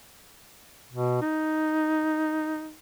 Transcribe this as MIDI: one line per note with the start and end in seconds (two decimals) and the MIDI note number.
0.93 1.18 47
1.22 2.74 63